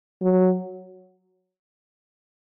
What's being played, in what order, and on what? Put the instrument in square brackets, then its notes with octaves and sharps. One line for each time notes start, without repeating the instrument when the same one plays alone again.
[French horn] F#3